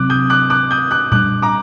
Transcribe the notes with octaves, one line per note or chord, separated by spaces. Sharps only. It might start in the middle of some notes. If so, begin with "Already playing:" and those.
Already playing: C3 F#3 C4 D6 F#6
D#6 G6
D6 F#6
D6 F#6
D#6 G6
D6 F#6
A#2 G3 D4 D6 F#6
A#5 D6